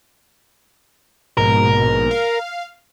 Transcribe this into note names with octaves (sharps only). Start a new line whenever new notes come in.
A#1 G#2 B2 A#4
F5